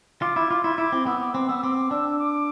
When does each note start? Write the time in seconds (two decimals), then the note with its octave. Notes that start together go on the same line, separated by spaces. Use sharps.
0.22 F4 D6
0.36 E4
0.50 F4 D6
0.64 E4 C6
0.78 E4 D6
0.92 C4
1.07 B3 E6
1.21 D6
1.34 C4 D6
1.48 B3 E6
1.59 E6
1.63 C4 D6
1.91 D4 E6
2.19 D6